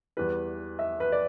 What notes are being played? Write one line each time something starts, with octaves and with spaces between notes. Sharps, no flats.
E2 E3 G3 B4
E5
B4
D5